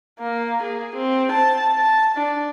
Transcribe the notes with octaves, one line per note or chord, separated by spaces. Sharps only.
A#3
G#4
C4
A5
A5
D4